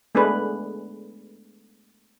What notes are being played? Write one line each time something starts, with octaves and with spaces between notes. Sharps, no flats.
G#3 A3 B3 D4 G#4 B4